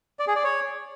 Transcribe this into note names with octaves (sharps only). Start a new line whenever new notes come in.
D5
G#4
D5
C#5